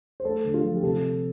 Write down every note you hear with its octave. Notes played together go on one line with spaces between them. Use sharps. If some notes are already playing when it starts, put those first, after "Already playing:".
C5
A3 A4
D3
F4
F3
G4
C3 A4